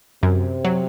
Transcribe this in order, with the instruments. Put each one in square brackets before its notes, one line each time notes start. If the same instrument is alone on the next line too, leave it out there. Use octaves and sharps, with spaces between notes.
[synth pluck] F#2 [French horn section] C3
[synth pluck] F#3